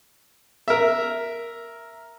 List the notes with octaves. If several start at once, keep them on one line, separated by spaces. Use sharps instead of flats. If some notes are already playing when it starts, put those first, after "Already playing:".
A#4 E5